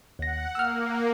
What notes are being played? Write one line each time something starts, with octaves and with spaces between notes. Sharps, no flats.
D#2 F#5 A#6
A#3 E6 F6